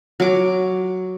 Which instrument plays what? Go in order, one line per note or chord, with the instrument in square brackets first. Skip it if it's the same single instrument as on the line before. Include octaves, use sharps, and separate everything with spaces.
[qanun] F#3 D6